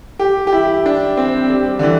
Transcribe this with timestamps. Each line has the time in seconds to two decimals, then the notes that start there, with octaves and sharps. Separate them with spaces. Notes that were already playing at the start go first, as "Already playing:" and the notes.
0.19 G4
0.47 G4
0.53 E4
0.86 D4
1.17 C4
1.50 G3
1.79 D3
1.83 E3